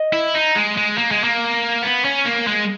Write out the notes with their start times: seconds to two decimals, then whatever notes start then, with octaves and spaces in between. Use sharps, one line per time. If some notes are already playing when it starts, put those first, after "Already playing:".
Already playing: D#5
0.13 E4
0.34 D#4
0.55 G#3
0.77 G#3
0.97 A#3
1.11 G#3
1.24 A#3
1.83 B3
2.05 C#4
2.25 A#3
2.47 G#3